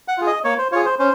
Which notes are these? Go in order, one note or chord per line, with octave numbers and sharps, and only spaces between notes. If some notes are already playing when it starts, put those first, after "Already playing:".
F#5
F4 G#4
D#5
A#3 C#5
C5
F4 G#4 C#5
C5
C#4 C5